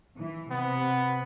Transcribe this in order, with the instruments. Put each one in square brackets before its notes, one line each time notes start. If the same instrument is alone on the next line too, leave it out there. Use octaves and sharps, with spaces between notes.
[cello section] E3
[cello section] C3 [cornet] B3